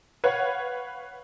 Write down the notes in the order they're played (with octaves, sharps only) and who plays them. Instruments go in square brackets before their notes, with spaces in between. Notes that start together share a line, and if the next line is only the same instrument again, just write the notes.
[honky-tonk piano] B4 C#5 F5 F#5